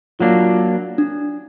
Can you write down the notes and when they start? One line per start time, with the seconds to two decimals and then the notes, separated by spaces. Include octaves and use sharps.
0.20 F#3 A#3 D4 F4
0.98 D4